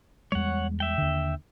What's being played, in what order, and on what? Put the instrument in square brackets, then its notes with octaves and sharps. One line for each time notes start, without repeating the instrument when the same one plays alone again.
[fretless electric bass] E2 G3 G#3 [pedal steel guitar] C#5 F#5
[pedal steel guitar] E5 G5
[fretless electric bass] D#2 D3